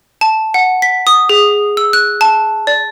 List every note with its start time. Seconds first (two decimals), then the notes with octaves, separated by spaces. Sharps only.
0.21 A5
0.54 F#5
0.82 B6
1.07 D#6
1.29 G#4
1.77 E6
1.93 F#6
2.21 A5
2.67 D5